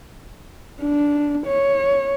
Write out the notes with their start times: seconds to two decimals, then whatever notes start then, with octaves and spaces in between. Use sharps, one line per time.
0.81 D4
1.46 C#5